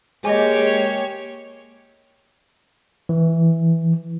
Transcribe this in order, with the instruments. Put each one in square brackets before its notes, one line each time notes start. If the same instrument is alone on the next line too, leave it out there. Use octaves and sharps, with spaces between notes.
[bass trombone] G#3 [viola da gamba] A#3 C#5 [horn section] G4 [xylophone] D#5 G#5
[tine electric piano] E3